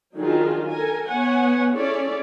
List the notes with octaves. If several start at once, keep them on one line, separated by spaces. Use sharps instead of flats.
D#3 F#3 D4 D#4 F4 G#4
A4 A#4 G#5
B3 C#5 F#5 G#5
C#4 E4 G#4 A4 C#5 D5